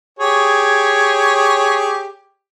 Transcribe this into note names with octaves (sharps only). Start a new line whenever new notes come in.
G4 G#4 C#5